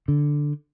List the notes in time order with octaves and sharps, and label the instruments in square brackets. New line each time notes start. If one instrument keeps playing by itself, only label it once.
[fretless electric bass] D3